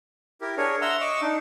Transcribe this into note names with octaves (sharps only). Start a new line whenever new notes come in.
E4 G4 A#4
D4 G#4 A#4 C#5
E5 F#5 A#5 C6 E6
D#5 C#6 D6 E6
D4 D#4